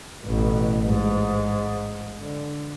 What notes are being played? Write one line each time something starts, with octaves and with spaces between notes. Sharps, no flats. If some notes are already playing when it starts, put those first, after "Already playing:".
A1 B2
G#2
D3